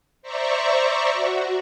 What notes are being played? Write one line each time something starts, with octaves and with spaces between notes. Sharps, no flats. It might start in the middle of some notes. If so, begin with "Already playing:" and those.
C5 D5 E5 A#5 C#6
F#4